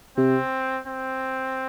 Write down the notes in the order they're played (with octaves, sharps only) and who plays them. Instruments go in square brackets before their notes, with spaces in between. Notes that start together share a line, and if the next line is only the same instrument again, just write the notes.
[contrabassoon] C3 [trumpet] C4
[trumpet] C4